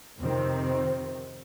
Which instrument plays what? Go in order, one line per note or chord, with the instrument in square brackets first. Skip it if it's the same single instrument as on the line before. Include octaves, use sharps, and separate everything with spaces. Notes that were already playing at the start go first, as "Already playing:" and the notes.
[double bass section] F2 C3 D#3 C4